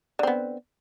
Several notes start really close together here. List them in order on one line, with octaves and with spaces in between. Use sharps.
D3 C4 B3